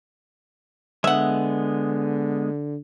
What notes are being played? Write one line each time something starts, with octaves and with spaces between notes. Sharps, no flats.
D3 G#3 B3 E5 F#5